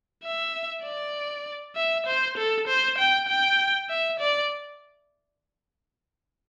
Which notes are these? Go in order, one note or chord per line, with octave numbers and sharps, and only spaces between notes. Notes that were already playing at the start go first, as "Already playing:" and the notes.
E5
D5
E5
C5
A4
C5
G5
G5
E5
D5